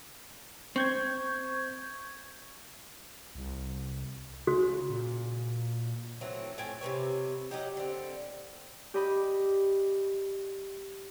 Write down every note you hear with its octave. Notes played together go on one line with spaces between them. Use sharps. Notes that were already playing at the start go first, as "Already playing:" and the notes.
C4 C#6 G6 G#6
C2
C#3 F#4
A#2
E3 F#3 A3 C4
A2 F4 G5 G#5
C3 G3 B4 C#5
F#3 D#4 G4
D3 C4
G4 D5 D#5 B5